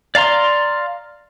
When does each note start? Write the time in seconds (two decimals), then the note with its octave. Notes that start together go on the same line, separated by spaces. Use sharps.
0.15 D5 F5 A#5 C6